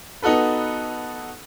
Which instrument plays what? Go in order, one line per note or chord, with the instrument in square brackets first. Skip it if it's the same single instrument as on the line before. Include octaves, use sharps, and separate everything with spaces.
[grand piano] B3 D#4 F#4 A4 B4